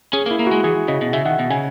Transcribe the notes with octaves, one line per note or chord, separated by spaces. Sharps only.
C#4 G#4
A#3
E4
A#3
G#3 F#4
E3 G#4
C#3 D#5
B2
C#3 E5
D#3 F#5
B2 F#5
C#3 G#5